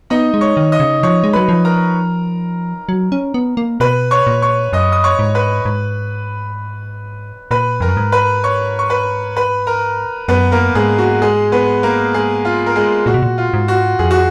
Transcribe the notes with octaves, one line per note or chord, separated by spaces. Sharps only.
B3 D#4 D#5
G#3
C#5 C#6
D#3
D#5 D#6
C#3
F3 C#5 C#6
G#3
F#3 B4 B5
F3
A#4 A#5
F#3
C#4
B3
A#3
B2 B4 B5
C#5 C#6
A#2
C#5 C#6
F#2 D#5 D#6
D#6
C#5 C#6
G#2
B4 B5
G#2
A#2 B4 B5
F2 A#4 A#5
F#2
G#2
B4 B5
C#5 C#6
C#6
B4 B5
B4 B5
A#4 A#5
F#2 B3 B4
A#3 A#4
G#2 G#3 G#4
F#4
G#3 G#4
B3 B4
A#3 A#4
G#3 G#4
F4
A#4
G#3 G#4
A#2 F#4
B2
A#2
F4
G#2
F#4
F2 G#4
F#4